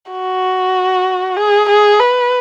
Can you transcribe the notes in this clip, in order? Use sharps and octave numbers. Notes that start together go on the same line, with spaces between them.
F#4
G#4
G#4
B4